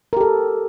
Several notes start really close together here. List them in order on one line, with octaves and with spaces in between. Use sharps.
A#4 G4 A4